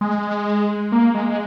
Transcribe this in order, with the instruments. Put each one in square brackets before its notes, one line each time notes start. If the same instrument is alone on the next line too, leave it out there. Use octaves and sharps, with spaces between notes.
[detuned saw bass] G#3
A#3
G#3
G#3